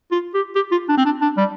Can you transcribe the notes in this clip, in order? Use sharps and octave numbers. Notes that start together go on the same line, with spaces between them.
F4
G4
G4
F4
D4
C4
D4
D4
G3